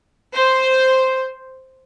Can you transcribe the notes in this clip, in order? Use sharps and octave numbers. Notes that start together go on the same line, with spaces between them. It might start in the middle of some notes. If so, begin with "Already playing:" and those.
C5